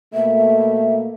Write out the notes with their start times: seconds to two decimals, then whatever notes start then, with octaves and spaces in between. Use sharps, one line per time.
0.14 B2 A3 A#3 E5